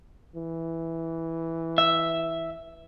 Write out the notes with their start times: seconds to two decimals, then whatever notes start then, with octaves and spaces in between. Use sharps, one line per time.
0.35 E3
1.78 E5